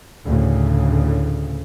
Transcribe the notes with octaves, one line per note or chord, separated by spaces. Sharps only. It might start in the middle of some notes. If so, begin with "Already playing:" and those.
D2 A2 C#3